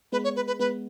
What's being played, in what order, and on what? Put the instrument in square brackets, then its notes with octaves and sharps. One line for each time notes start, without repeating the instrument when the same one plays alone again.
[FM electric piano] G#3 B3 [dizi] B4
[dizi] C#5
B4
B4
[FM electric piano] G#3 B3 [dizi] B4